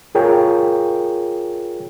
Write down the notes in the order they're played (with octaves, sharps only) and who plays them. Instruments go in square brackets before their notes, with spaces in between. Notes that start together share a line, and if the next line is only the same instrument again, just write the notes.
[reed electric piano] F4 G#4 A#4 C#5 G5